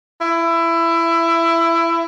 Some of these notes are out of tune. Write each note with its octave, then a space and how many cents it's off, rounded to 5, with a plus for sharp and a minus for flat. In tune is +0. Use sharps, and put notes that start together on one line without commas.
E4 +20